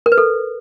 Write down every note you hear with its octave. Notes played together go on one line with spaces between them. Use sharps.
A#4
B4
A4